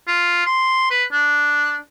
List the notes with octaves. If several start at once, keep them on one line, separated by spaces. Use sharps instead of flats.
F4
C6
B4
D4